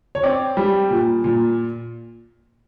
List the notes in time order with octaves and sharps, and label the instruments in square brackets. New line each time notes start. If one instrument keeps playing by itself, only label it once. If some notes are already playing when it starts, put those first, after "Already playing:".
[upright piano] C#5
C4 D5
G3
A#2
A#2